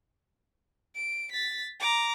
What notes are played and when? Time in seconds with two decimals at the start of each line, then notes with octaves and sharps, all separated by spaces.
0.95 D7
1.32 A6 B6
1.80 A#5 D6